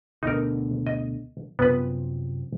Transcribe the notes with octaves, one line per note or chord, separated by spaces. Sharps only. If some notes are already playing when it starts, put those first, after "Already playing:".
D2 B2 D3 D#4 A#4
D#5
F#2 C3 F3 B3 B4